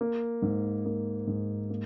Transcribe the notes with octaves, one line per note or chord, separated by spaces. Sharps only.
A#3
G#2
A#3
G#2
A#3